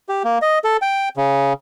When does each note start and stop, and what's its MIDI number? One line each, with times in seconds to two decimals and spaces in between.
0.09 0.23 67
0.24 0.38 58
0.42 0.59 75
0.64 0.77 69
0.82 1.09 79
1.17 1.53 49